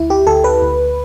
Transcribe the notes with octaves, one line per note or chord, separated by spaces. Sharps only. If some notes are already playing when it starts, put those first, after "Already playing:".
Already playing: D2 E4
G4
D2 A4
B4
D2